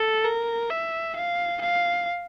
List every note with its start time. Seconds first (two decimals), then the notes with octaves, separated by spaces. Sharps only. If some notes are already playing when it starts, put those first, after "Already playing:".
Already playing: A4
0.25 A#4
0.70 E5
1.16 F5
1.61 F5